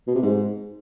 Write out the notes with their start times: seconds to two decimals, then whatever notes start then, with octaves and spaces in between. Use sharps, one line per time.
0.08 B2
0.15 C3
0.22 G#2